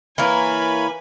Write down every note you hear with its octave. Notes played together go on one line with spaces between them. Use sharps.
E3 A#3 B4 C#5 G#5 B5